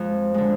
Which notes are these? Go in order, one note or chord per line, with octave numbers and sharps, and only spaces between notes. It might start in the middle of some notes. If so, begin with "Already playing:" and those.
Already playing: F2 G#3
D3 G#3